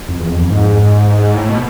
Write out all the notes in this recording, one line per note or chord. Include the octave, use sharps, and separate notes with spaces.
F2
E2
F2
F2
G#2
A2
B2